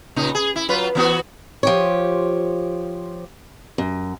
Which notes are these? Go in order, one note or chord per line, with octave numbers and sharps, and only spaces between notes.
A#2 C#3 D#4
G#4
E4
F#3 F4 B4
E3 B3 F#4
F3 G4 C#5
F#2